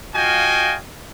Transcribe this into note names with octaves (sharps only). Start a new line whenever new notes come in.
F4 F#4 D#5 F5 G5 G#5